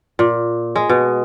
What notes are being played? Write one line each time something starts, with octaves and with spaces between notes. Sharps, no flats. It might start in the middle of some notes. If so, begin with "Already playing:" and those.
A#2
G#3
B2